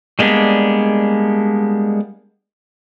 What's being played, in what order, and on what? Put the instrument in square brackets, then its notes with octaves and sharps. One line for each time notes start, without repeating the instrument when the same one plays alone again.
[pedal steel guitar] G3 G#3 A#3 B3 D4